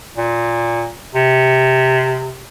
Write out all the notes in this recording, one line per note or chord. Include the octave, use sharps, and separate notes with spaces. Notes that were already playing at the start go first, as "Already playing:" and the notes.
A#2
C3